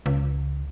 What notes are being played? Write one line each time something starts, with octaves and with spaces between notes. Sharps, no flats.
C#2